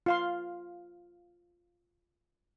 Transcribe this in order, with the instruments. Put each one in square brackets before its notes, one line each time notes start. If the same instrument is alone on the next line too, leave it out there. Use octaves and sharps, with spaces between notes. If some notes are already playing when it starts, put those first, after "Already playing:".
[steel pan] F4 F5 C6